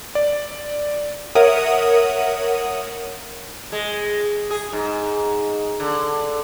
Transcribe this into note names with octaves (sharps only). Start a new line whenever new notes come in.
D5
A#4 C#5 E5 F#5 D#6 D#7
G#3
G#4
G#2
D3